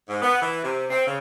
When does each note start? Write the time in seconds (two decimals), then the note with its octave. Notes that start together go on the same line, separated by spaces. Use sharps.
0.08 G#2
0.22 B3
0.41 E3
0.63 C3
0.90 C4
1.07 C#3